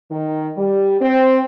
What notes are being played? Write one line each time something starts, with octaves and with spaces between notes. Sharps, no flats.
D#3
G3
C4